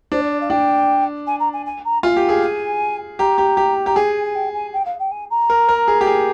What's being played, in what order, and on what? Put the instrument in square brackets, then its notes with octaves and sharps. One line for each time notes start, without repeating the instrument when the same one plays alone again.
[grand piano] D4 [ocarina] C5
[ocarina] D5
D5
F5
[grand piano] D4 [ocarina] G5
[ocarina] G#5
A#5
G#5
G#5
A#5
[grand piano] F4 [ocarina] G#5
[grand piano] G4
G#4
[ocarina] G#5
[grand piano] G4 [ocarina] A#5
[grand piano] G4
G4
[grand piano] G4 [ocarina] A#5
[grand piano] G#4 [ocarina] G#5
[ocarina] G#5
G5
G#5
G5
F5
G5
G#5
A#5
[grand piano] A#4
A#4
G#4
G4
G#4